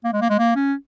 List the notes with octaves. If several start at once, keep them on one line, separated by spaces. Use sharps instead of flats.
A#3
G#3
A#3
G#3
A#3
C#4